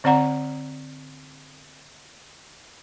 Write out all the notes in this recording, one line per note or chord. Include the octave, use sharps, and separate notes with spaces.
D3 C4 D5 F#5 A#5